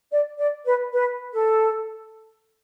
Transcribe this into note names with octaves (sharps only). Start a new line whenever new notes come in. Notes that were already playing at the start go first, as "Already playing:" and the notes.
D5
D5
B4
B4
A4